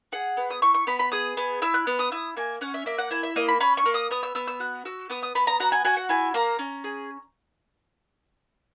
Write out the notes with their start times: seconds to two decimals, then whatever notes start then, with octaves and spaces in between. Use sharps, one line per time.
0.12 G#4 F#5
0.37 B3
0.50 D#6
0.62 E4 C#6
0.74 C#6
0.87 B3 B5
0.99 B5
1.12 G#4 D#6
1.37 B3
1.62 E4 E6
1.74 F#6
1.87 B3
1.99 D#6
2.12 E4 D#6
2.37 A#3 G#5
2.61 C#4 F#5
2.74 E5
2.86 A#3 E5
2.98 F#5
3.11 E4 G#5
3.23 E5
3.36 A#3 D#5
3.48 B5
3.60 C#4 B5
3.77 C#6
3.86 A#3
3.94 D#6
4.11 B3 D#6
4.23 E6
4.35 B3 E6
4.47 E6
4.60 F#4 F#6
4.85 F#4 E6
5.10 B3 D#6
5.23 D#6
5.35 B3 B5
5.47 A#5
5.60 F#4 A#5
5.72 G#5
5.85 F#4 G#5
5.97 F#5
6.09 E4 G#5
6.34 A#3 A#5
6.59 C#4
6.84 G#4